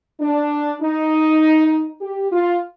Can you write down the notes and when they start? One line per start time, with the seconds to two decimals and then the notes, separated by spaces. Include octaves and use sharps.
0.21 D4
0.82 D#4
2.01 G4
2.32 F4